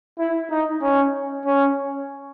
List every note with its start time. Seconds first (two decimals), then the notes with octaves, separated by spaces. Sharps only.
0.19 E4
0.50 D#4
0.82 C#4
1.46 C#4